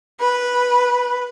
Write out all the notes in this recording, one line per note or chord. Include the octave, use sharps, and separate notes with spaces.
B4